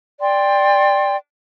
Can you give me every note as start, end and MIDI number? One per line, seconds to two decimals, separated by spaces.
0.21 1.15 74
0.21 1.15 79
0.21 1.15 84